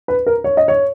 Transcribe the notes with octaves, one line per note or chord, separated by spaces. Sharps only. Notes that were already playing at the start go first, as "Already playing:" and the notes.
B4
A#4
C#5
D#5
C#5